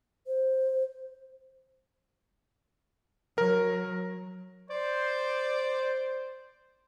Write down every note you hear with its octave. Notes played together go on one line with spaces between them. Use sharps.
C5
F#3 A#4
C5 D5